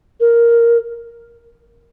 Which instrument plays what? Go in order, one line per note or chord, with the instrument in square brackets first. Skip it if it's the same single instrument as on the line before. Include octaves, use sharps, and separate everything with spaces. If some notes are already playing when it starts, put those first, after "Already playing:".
[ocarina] A#4